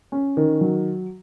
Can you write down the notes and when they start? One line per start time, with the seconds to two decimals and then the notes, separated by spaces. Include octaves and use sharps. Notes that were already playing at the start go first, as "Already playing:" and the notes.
0.12 C#4
0.37 D#3
0.61 F#3